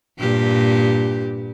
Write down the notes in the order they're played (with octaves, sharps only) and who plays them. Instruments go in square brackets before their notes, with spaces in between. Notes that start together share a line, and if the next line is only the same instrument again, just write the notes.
[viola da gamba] G2 A#2 G4